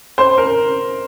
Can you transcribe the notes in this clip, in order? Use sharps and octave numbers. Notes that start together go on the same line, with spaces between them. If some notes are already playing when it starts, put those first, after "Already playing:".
C5
A#4